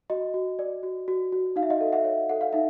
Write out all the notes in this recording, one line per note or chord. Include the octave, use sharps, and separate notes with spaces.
F#4 D#5
F#4
D5
F#4
F#4
F#4
D#4 F5
E5
D#5 F5
A4
E5 F#5
C#5
A4 F#5
F5
D#4 E5